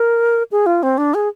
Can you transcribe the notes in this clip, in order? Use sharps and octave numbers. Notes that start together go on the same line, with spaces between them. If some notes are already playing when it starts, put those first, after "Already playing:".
Already playing: A#4
G#4
F4
C4
D4
G#4